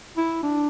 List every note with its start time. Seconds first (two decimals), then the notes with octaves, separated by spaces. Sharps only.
0.17 E4
0.43 D4